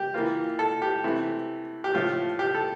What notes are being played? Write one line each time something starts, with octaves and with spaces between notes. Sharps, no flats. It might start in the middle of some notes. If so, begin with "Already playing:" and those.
Already playing: G4
E3 A#3 F4
A4
G4
C3 E3 A3
G4
A2 F3 A3 F4
G4
A4